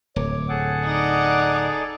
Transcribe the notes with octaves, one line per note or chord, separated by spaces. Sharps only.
D1 C#5 D6
G#4 A4 F#5
D#4 D5